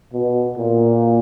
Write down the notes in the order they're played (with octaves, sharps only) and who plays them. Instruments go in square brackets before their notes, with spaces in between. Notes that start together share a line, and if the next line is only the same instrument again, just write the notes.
[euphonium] B2
A#2